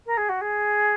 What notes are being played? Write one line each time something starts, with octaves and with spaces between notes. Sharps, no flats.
A#4
G#4
F#4
G#4